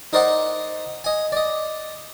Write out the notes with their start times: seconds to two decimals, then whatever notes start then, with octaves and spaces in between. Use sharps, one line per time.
0.13 D#4 A#4 C5 D5 D#5 F#5
1.04 D#5 G#5
1.32 D5 D#5